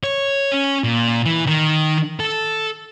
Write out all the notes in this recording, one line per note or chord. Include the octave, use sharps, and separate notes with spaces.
C#5
C#4
A#2
E3
D#3
A4